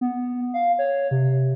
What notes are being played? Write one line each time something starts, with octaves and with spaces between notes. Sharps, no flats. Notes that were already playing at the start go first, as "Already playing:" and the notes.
B3
F5
C#5
C3